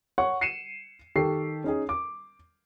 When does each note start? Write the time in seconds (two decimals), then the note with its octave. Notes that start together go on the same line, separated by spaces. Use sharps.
0.18 C#5 F#5 C#6
0.41 C7 C#7 D#7 E7
1.16 D#3 G4 A4 C#6 C7
1.64 C#4 D#4 G#4
1.89 D6